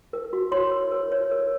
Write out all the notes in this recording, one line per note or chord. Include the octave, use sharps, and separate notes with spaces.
A#4
F#4
C#5 C6
A#4
A#4
C#5
A#4